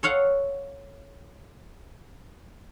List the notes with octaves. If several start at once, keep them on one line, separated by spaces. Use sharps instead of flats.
A4 C#5 F5 F#5